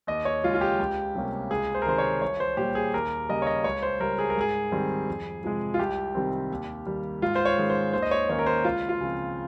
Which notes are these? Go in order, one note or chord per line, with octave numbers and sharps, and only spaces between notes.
D#2 D#5
C#5
C#3 G#3 F4
F4
G4
C#2
C3 G3 A#3 C#4
C#2 G#4
C5
A#4
C3 D#3 C5
C#5
C2 C#5
C5
A#2 G3 G4
G#4
D#2 A#4
C#3 G3 A#3 D#5
C#5
D#5
C#2 C#5
C5
C#3 G3 A#4
G#4
A#4
G#2 G#4
D#3 G3 C4
F2
C3 F3 G#3
F4
C2 G4
C3 D#3 G3 C4
D#2
D#3 G3 A#3
G#2 F4
C5
C#5
D#3 G#3 C#4
C5
D#2 C5
D#5
C#5
D#3 A#3 C#4 C#5
A#4
C5
C#2 F4
F4
C#3 F3 C4